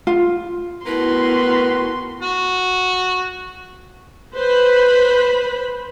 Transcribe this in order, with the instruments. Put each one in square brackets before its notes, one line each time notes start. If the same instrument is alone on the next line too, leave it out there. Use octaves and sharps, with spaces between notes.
[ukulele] F4
[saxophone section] A2 A#4 B4 [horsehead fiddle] B3 F#4 [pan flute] E4 [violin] C6
[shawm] F#4
[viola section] B4 C5 B5